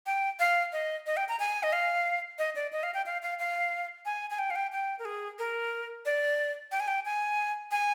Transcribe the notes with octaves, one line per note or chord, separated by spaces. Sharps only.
G5
F5
D#5
D#5
G5
A#5
G#5
D#5
F5
D#5
D5
D#5
F5
G5
F5
F5
F5
G#5
G#5
G5
F5
G5
G5
A#4
G#4
A#4
D5
G5
G#5
G5
G#5
G#5